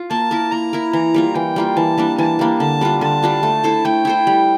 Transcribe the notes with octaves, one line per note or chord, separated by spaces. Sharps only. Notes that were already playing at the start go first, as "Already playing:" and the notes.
Already playing: F4
A#3 A5
E4 A#4
A#3 A#5
E4 A#4
E3 A#5
G3 A#3 F4
E3 G5
G3 A#3 F4
E3 A5
G3 A#3 D4
E3 A5
G3 A#3 D4
D3 A5
G3 D4 F4
D3 A5
G3 D4 F4
A3
E4 A4 C5
A3 G5
E4 A4 C5
G3